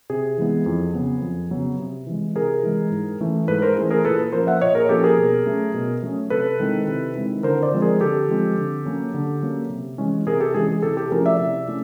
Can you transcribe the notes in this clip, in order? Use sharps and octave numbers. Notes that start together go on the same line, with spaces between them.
C3 G#4
E3 G#3 B3 E4
F2
C#3 F#3 B3
F2
C#3 F#3 B3
C3
E3 G#3
C3 G#4 A#4
E3 G#3
G#2
E3 A3 C#4 E4
G#2 A4 B4
A#4 C5
E3 A3 C#4 E4 G#4
G#4 A#4
A#2 A4 B4
F3 A#3 C#4 A#4 C5
E5 F#5
A#2 C#5 D#5
G#4 A#4
F3 A#3 C#4 G4 A4
G#4 A#4
B2
F#3 A3 C#4
B2
F#3 A3 C#4
C3 A4 B4
D#3 G#3 C4 E4
C3
D#3 G#3 C4 E4
D3 A#4 C5
C5 D5
F3 G#3 C4
G#4 A#4
D3 G4 A4
F3 G#3 C4
D3
F#3 A#3 C#4
D3
F#3 A#3 C#4
C3
E3 G#3 C#4 E4
C3 G#4 A#4
G4 A4
E3 G#3 C#4 E4 G#4
G#4
C3 G4 A4
G4 A4
F3 A3 C#4 E4 G#4 A#4
D5 E5
C3
A3 C#4 E4